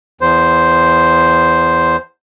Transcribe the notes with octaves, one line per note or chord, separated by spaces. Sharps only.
E2 C5